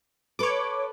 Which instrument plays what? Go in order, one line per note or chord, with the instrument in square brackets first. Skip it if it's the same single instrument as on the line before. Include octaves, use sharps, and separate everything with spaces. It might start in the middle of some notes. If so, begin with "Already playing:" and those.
[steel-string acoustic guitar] A4 B4 [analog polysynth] C#5 D6